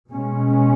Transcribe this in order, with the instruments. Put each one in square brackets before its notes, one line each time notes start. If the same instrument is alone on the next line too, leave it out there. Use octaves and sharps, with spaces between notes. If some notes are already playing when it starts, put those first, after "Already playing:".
[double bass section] B2 G#3 C#4